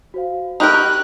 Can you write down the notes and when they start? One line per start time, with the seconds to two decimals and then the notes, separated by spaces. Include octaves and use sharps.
0.14 F#4 C5 F5
0.60 D#4 G4 A#4 B5 C#6 F#6 G6